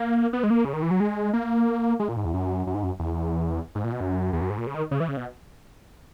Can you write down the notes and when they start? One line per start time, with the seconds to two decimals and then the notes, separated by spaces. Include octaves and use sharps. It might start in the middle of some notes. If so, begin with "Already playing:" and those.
Already playing: A#3
0.33 B3
0.43 G#3
0.50 A#3
0.65 C#3
0.73 D#3
0.82 E3
0.91 F#3
1.00 G#3
1.33 A#3
2.00 G#3
2.08 A#2
2.17 G#2
2.25 E2
2.34 F#2
2.67 F#2
2.75 G#2
2.83 F#2
3.00 E2
3.75 G#2
3.84 A#2
3.92 B2
4.00 F#2
4.33 E2
4.41 F#2
4.50 G#2
4.58 A#2
4.67 C#3
4.75 D#3
4.91 C#3
5.00 E3
5.08 C#3
5.17 B2